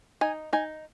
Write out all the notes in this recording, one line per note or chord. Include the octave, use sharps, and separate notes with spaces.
D#4 G#5
D#4 G#5